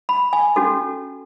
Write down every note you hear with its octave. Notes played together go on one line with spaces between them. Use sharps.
B5
G#5
C#4 F#4 A4